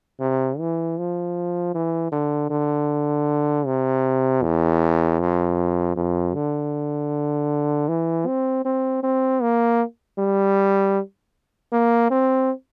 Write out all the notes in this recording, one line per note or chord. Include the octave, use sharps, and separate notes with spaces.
C3
E3
F3
E3
D3
D3
C3
E2
F2
F2
D3
E3
C4
C4
C4
A#3
G3
A#3
C4